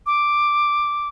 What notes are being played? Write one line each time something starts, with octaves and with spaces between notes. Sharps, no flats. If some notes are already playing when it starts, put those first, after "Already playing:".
D6